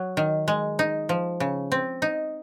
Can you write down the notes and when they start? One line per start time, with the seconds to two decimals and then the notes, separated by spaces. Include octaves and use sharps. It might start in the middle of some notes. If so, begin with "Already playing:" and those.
Already playing: F#3
0.17 D#3
0.48 G#3
0.79 D#4
1.09 F3
1.40 C#3
1.72 C4
2.02 D#4